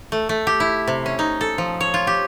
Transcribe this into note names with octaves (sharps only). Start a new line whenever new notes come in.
A3
A3
G4
E4
C3
C#4
D#4
A4
F3
C#5
F4
G4